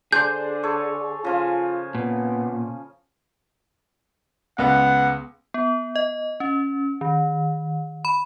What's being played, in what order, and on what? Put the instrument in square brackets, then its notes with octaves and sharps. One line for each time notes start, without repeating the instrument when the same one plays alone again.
[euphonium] D3 [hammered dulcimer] D4 C5 [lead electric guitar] G#4 [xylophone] G6
[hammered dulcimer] A4 C#5
[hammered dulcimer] C#3 F3 G#5 [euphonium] F4
[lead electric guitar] A#2 [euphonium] B3
[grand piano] C#2 B3 [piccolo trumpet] F#5
[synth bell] B3
D#5
C#4
D#3
B5